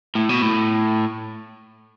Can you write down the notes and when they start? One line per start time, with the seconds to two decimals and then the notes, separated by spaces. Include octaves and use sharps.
0.15 A2
0.29 B2
0.42 A2